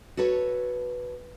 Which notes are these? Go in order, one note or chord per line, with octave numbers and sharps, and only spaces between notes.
F#4 A4 B4 C#5